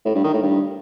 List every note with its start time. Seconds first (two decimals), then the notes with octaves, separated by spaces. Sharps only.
0.05 A2
0.14 G2
0.24 D#3
0.33 A2
0.42 G2